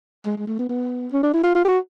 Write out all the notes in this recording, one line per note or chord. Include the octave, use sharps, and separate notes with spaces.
G#3
G#3
A3
B3
B3
C#4
D4
E4
F4
F4
G4
F#4